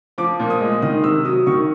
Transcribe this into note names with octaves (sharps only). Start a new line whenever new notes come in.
F3 D6
A#2
D#6
G#3
D#3 D#6
C3 E6
F#3 D#6
D#3 C#6